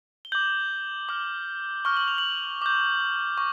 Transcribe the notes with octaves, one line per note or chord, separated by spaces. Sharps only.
G7
D6 G6 F#7
D6 F6
C#6 F6 G7
F#7
F7
F#7
D6 G6
C#6